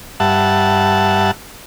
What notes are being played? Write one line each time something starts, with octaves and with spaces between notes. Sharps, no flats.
G2 E5 F#5 A5